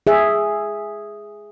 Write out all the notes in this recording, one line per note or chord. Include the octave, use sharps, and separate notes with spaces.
G#4 E5